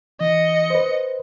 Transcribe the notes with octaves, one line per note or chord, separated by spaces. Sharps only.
E3 D#5 C#7
B4 C5